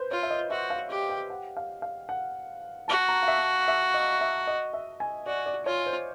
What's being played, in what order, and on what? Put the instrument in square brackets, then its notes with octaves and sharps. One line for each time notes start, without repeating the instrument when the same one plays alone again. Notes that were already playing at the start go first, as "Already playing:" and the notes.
Already playing: [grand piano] B4 C5
[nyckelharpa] F4 [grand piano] C#5
[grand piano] E5
D#5
[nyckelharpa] F#4 [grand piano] E5
[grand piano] F5
[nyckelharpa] G4
[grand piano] G5
F#5
F5
F5
F#5
[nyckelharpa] F#4 [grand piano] A5
[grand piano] A#5
F5
E5
E5
D#5
E5
D#5
E5
G#5
[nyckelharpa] F#4 [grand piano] D5
[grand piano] D5
[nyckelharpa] F4 [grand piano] C#5
[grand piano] C5